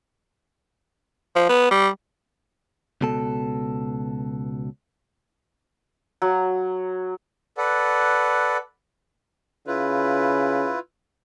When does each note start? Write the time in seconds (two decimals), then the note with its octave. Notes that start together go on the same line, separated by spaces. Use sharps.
1.36 F3
1.49 B3
1.71 G3
3.01 C#2 B2 A4
6.22 F#3
7.58 A4 B4 D5 F#5
9.67 C#3 E4 F4 B4